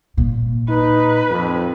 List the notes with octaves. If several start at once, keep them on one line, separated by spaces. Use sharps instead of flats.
A#2
D#4 B4
F2